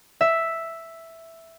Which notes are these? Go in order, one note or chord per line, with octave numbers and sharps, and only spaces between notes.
E5